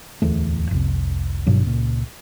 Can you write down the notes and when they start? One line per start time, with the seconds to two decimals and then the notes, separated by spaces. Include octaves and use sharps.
0.22 D1 E2 A3
0.71 F1 C2
1.47 G1 G2 B2 F#3
1.63 C#2 A#2